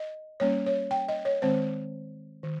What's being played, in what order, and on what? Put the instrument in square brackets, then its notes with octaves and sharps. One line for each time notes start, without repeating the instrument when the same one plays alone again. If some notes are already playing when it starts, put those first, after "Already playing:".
Already playing: [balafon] D#5
G3 A#3 C#4 C#5
C#5
G5
D#5
C#5
D#3 G#3 C4 C5
D#3